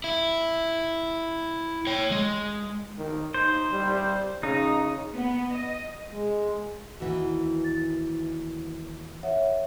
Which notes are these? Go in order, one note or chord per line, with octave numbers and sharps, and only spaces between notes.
E4
C#5 G5
G#3
D#3
D#4 C5
G3
C#3 D#4
B3
D#5
G#3
D#2 E3 F#4 F#5
A6
D#2 C#5 E5 F#5